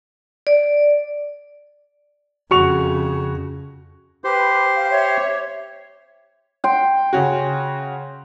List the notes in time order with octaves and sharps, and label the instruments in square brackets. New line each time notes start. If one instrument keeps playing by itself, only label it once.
[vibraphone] D5
[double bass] F2 C#3 [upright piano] F#4 C#6 F7
[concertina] G4 C5 C6 [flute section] B4
[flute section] F5
C#5 E5
[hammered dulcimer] G5 C6
[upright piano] C#3 C#4 F#4